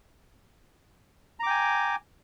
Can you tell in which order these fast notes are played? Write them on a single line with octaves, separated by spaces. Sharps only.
A#5 D6 G5 G#5